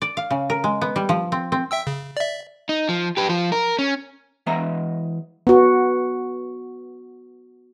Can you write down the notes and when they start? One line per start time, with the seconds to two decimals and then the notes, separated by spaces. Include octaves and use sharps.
0.02 D5
0.17 F5
0.31 C#3
0.50 A#4
0.64 G#3
0.81 B3
0.96 G3
1.09 F3
1.32 C4
1.52 C4
1.71 E5 G5 E6
1.87 C#3
2.17 D5 E5
2.69 D#4
2.89 F3
3.17 G4 B4
3.29 F3 F4
3.52 A#4
3.79 C#4
4.46 E3 G#3 B3 D#5 E5 A#5
5.47 B3 F#4